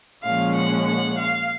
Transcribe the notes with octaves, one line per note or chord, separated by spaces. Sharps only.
A#2 F3 G#3 C#4 F5
F#5
F#5
F5